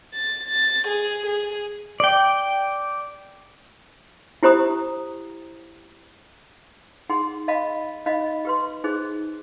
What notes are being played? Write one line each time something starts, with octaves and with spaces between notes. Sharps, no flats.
A6
A6
G#4
G#4
D5 G5
E4 G4 C5 A#5 D#6
D#4 G#4 F#5 C6
D#5 F5 A5 B5
D#4 D#5 F5 B5
G4 B4 C6
D#4 G#4 C5